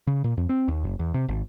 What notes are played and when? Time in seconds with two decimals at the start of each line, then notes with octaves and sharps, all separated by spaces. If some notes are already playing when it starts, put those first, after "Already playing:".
0.07 C#3
0.24 A#2
0.37 F2
0.49 C4
0.68 D#2
0.84 F#1
0.99 E2
1.14 C3
1.29 G#1